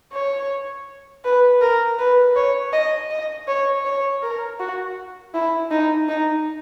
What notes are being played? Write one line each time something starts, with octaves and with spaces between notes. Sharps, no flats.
C#5
B4
A#4
B4
C#5
D#5
D#5
C#5
C#5
A#4
F#4
E4
D#4
D#4